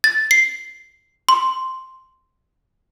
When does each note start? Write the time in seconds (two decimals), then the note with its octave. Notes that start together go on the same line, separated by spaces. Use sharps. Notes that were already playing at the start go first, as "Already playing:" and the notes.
0.04 A6
0.31 C7
1.29 C6